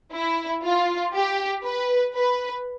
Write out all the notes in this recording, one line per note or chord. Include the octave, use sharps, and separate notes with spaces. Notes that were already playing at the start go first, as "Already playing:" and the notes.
E4
F4
G4
B4
B4